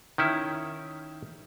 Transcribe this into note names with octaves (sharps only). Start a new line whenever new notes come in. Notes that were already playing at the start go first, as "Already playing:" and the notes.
D#3 C#4 E4